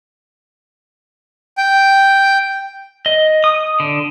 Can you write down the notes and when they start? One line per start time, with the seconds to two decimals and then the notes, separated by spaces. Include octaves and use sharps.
1.58 G5
3.06 D#5
3.44 D#6
3.80 D3